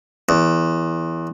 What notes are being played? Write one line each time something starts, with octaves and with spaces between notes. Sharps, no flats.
E2